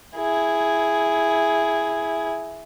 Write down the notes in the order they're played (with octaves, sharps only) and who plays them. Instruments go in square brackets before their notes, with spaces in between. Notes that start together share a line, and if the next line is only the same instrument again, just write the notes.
[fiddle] E4 G#4